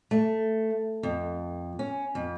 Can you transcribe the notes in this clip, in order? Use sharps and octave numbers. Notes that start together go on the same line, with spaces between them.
A3
F2
C#4
F2